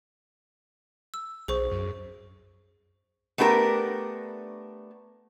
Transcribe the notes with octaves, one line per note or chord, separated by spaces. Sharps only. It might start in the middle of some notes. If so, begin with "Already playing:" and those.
E6
B1 G#4 C5 C#6
F#2
A3 B3 D4 G4 A#4